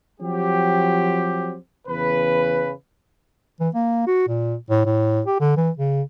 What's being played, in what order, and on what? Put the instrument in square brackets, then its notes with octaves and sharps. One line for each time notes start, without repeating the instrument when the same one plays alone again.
[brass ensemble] F3 F#3 C4 G4
E2 C#3 B4
[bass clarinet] E3
A#3
F#4
A#2
A2
A2
G4
D3
E3
C#3